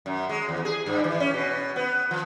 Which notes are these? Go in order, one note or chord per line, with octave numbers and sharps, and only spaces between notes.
F#2
G#3
E2
G#4
G2
E3
C#4
B2
B3
F3